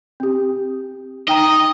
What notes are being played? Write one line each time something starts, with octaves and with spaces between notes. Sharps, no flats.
C4 G4
D#4 D#5 G5 A#5